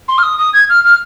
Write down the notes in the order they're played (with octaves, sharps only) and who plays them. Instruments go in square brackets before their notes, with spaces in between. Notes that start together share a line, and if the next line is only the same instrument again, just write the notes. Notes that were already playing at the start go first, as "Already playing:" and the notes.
[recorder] C6
F6
D#6
D#6
G#6
F6
F6